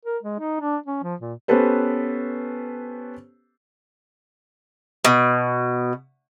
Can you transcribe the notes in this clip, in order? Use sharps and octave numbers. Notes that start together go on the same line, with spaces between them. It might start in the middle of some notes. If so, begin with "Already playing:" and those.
A#4
G#3
D#4
D4
C#4
F3
A#2
B3 C#4 G4 A4 B4 C5
B2